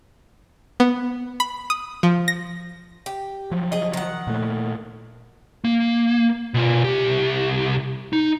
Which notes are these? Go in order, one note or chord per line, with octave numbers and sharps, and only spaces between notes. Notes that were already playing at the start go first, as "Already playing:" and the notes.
B3
B5
D#6
F3
A#6
G4
F3 F#3
G#4 D#5
D#3 F#5
A#2 A3
A#3
B2 F4
C2 G4
D#4